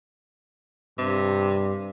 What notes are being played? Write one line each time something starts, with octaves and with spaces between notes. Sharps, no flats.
G2 C3